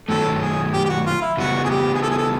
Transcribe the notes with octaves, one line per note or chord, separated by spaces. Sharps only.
D#3 F#3 A3 A4
G#4
G4
G4
F#4
F4
E4
C#3 E3 G3 B3 E4 F#4
G#4
G4
G#4
A4
G#4
A4